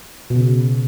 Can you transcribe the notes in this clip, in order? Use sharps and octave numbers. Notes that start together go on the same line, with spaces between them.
B2
C#3
B2